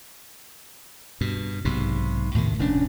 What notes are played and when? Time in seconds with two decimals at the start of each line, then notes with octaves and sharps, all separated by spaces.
1.21 G2 B2
1.65 B1 G#2 C3
2.34 D#2 A2 C3 D#3
2.59 F1 D#2 C#4 D4